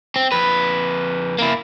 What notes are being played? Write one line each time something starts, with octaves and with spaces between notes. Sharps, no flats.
C4
F2 B4
A#3 E4